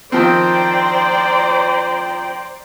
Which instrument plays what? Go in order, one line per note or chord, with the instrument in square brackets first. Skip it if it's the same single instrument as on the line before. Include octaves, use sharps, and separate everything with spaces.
[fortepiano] D#3 F3 C4 [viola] C5 D5 [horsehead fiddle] G5 A#5